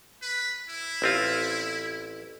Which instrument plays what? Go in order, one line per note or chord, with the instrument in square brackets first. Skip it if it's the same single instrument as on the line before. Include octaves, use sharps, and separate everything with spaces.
[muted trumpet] B4
E4
[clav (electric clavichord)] A1 C4 F4